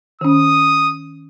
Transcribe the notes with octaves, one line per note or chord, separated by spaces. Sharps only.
D#3 C#4 D#6